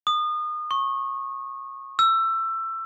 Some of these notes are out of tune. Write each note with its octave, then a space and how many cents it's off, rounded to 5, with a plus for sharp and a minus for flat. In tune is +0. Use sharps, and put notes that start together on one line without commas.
D#6 -30
C#6 -20
E6 +20